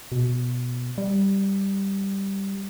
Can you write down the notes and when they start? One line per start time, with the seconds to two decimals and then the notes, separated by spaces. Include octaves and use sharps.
0.12 B2
0.98 G3